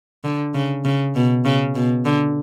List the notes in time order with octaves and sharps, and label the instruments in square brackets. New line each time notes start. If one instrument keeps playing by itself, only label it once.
[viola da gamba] D3
C#3
C#3
B2
C#3
B2
D3